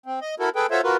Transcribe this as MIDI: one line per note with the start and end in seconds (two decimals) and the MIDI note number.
0.06 0.20 60
0.22 0.35 75
0.40 0.49 64
0.40 0.49 66
0.40 0.49 69
0.40 0.49 70
0.56 0.66 68
0.56 0.66 69
0.56 0.66 71
0.56 0.66 79
0.71 0.81 65
0.71 0.81 66
0.71 0.81 69
0.71 0.81 72
0.71 0.81 73
0.71 0.81 76
0.84 0.97 65
0.84 0.97 66
0.84 0.97 70
0.84 0.97 71